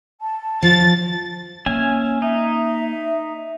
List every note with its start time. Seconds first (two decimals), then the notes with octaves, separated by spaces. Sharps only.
0.21 A5
0.63 F3 A6
1.66 A#3 C#4 E5 G#5
2.22 D#4 E5